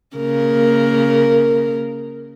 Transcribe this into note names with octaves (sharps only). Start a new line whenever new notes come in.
C#3 A#3 A#4